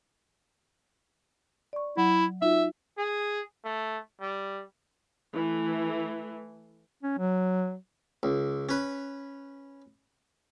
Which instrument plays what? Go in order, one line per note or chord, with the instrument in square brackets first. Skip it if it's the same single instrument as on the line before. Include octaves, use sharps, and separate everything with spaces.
[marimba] D5 C#6
[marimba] F#3 F#5 [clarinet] E4
[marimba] D#4 F4 F#4 [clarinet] E5
[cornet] G#4
A3
G3
[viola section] E3 A3
[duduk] C#4
F#3
[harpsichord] C#2
C#4 B4